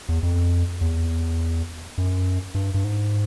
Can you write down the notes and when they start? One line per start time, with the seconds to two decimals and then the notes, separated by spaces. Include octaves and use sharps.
0.09 E2
0.23 F2
0.81 E2
1.98 F#2
2.55 G2
2.74 G2
2.84 G#2